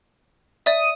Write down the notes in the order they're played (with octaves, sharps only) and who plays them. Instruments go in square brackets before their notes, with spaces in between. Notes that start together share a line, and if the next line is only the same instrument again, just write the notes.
[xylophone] D5 E5 [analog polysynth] D#6